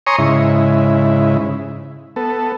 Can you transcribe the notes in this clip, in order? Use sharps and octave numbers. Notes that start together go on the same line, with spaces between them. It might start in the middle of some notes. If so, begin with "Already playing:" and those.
C#5 G#5 A#5 C6 C#6 D#6
G#2 C#3 E4
B3 A4